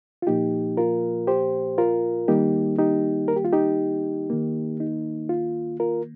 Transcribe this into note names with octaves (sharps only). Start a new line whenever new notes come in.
F4
A#2 F3 A#3 D#4 G4
F4 A#4
G4 C5
F4 A#4
D#3 G3 A#3 D#4 G4
D#4 G4
A#4
G4
F4
D#4 G4
D#3 A#3
D#4
F4
F4 A#4